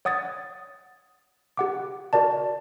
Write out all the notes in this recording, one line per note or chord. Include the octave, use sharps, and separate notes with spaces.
C#5 F#5 D#6 G#6 A6
G4 F#5 D6
F#4 A#4 D5 A5